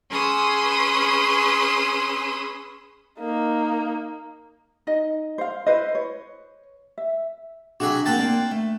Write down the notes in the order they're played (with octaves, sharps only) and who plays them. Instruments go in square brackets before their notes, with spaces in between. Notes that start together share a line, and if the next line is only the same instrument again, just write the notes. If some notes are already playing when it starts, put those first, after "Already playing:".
[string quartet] C#4 G#4 B4 C6 D#6 E6
[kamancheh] A#3 D#4
[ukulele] D#4 D#5
C5 F5
E4 B4 C5 D#5
C#5
E5
[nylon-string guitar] C3 F#3 [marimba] D4 F#6 [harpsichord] F#4 G#4 E5
[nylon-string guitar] F3 A#3 C4 [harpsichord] F#5 G5 A5
[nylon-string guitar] A#3 C4 D5
A3